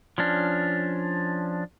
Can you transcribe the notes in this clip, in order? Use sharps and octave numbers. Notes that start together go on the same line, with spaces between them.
F3 C#4 D4